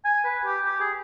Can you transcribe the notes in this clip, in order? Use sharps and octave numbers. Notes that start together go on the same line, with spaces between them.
G#5
B4
G4
G4
G#4